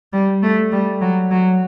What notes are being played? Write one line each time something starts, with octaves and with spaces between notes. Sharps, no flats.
G3
A3
G3
F#3
F#3